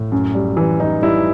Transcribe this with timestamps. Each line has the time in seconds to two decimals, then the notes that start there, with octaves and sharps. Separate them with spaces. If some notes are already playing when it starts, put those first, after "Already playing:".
Already playing: A2
0.12 F#2
0.34 G3
0.57 E3
0.80 E3 D#4
1.02 G3 E4